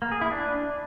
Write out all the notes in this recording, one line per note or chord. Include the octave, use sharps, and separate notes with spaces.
A#3
G#4
E4
D4